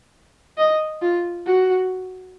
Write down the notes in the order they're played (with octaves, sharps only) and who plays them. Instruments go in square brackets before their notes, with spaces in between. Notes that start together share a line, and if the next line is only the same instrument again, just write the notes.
[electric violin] D#5
F4
F#4